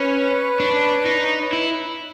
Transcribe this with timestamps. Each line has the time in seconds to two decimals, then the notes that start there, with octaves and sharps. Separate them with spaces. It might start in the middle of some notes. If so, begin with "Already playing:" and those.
Already playing: C#4 B4 C#5
0.60 D4
1.06 D#4
1.53 E4